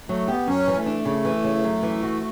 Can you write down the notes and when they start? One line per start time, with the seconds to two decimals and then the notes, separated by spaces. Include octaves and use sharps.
0.08 F#3 A3
0.27 B3 G4
0.47 F#2 C#4
0.67 E3
0.76 A3
0.86 D4
1.05 C#3
1.25 E3
1.44 C#3
1.64 F#2
1.83 E3
2.03 F#4